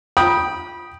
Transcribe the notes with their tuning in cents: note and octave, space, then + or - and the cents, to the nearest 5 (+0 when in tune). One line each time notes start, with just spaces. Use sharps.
G5 +0 B5 -20 D#6 +0